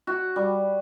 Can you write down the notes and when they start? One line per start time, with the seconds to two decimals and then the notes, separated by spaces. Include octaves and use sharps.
0.07 F#4
0.36 G3